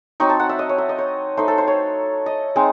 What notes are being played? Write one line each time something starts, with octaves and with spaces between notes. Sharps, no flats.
F#3 C4 D#4 C#6
A5
F#5
E5
D#5
C#5
E5
D#5
C#5
A3 D#4 C5
A4
C5
C#5
D#5
G#3 C4 D#4